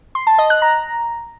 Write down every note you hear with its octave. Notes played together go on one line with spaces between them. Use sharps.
C6
A5
D#5
F#6
A#5